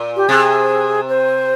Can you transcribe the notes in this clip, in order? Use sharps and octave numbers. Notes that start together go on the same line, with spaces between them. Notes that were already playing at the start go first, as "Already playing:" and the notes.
Already playing: A#2
G4
C3 G#4
C5